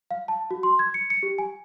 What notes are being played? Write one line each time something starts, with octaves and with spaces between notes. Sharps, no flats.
F5
A5
F#4
C6
G#6
C#7
C#7
G4
G#5